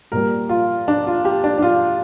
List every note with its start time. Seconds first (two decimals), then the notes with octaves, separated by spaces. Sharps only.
0.12 A#2 G3 A#4
0.49 F4
0.88 D4
1.07 F4
1.25 G4
1.44 D4
1.58 D4
1.62 F4